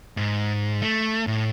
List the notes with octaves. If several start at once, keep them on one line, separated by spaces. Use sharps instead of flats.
G#2
A3
A2